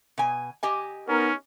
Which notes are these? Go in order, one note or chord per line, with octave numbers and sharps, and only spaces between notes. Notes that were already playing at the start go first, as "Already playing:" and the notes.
B2 G#5
G4 D#5 G#5
B3 C#4 D#4 A#4